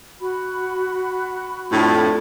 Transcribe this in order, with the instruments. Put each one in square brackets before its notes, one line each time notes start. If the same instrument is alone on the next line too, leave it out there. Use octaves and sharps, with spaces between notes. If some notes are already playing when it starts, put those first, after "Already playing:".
[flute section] F#4 B5
[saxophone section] F2 A2 [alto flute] D4